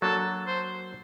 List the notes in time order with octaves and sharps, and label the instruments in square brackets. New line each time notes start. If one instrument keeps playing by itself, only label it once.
[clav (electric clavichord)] F#3 A#3 D4 [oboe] A4
[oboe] C5